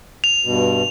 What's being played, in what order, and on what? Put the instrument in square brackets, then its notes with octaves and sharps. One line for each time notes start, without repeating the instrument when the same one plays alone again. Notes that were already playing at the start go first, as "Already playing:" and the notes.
[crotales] F7
[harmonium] G2 B2